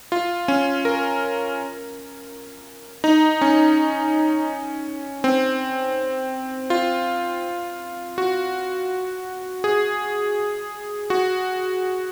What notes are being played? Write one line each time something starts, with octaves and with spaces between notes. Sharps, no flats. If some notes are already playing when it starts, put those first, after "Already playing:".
F4
C#4
A#4
D#4
C#4
C4
F4
F#4
G#4
F#4